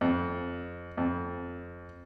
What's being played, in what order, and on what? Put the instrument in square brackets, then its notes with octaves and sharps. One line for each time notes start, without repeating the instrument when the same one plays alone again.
[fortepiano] F2
F2